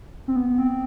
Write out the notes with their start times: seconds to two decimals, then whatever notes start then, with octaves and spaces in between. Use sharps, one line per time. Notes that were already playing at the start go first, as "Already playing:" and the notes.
0.28 C4
0.36 B3
0.50 B3
0.58 C4